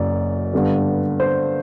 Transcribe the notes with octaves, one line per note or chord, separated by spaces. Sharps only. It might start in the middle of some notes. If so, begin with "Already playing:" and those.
Already playing: F#1 F#2 D5
G2 D3 G3 B3
C5